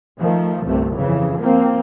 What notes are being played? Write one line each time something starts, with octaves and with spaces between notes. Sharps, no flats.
D#3 F3 A3
G1 C2 C3 A3
F2 C#3 E3
F3 A#3 C4